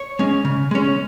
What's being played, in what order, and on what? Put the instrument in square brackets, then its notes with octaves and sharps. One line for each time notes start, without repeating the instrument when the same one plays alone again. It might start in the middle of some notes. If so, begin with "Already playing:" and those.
Already playing: [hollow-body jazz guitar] C#5
G#3 C#4
C#3
G#3 C#4